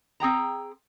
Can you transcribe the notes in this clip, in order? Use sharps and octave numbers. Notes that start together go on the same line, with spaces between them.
C4 G#4 G5 A#5